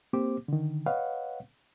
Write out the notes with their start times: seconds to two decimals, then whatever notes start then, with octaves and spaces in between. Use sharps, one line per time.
0.13 A#3 C4 G4 C5 D6
0.48 D3 D#3
0.86 B4 C#5 D#5 F5 F#5